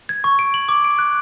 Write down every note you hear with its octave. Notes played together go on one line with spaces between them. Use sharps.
G#6
C#6
D7
F#7
D6
D7
F#6